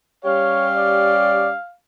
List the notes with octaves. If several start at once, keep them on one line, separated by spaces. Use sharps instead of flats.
G3 C#4 G4 C#5 F5
D5